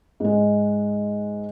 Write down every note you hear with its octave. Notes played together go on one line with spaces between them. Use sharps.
G#2 G#3